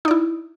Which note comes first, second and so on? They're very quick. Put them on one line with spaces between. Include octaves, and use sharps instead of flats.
D#4 D5 E4